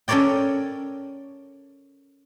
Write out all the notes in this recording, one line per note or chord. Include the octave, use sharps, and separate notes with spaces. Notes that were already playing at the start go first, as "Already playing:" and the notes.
C#4 A4 A#4 C#5 D5 G5